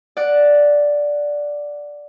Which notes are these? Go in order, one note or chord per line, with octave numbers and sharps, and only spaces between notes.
D5 F#5